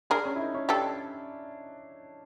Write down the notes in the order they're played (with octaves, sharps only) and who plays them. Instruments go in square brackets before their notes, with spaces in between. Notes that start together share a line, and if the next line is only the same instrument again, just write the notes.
[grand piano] D4 [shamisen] G#4 A#4
[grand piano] C#4
E4
D#4
C#4
[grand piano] D4 [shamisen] G4 A4